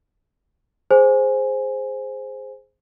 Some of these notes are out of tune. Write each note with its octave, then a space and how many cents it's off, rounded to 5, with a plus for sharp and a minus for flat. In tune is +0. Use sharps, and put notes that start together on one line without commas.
G#4 +0 C5 +0 G#5 +0